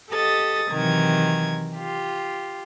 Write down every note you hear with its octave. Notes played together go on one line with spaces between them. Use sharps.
G4 A4 D#5 D#6 A6
C3 D#3 E3 F#3 A#4 G#6
F4 G4